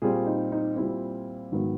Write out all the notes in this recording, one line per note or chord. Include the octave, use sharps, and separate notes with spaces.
A#2 G3 C4 G#4
D#4
D#4
A#2 G3 C4 E4
G#2 D#3 F#3 B3